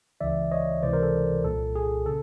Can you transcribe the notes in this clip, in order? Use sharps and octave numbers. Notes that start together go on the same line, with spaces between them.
C#2 C#3 E3 D5 E5
C#5 D#5
C#2 C3 E3 C5 D5
A#4 C5
A4
C2 A#2 A4
G#4
C#3 A4